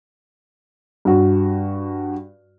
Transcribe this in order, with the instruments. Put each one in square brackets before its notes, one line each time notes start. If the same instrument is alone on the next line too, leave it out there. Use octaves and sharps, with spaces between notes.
[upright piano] G2 F#4